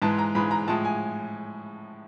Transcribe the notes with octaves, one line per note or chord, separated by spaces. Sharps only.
G#2 E3 G#3 A5
A#5
G#2 E3 G#3 B5
A#5
A2 F3 G#3 A5
G#5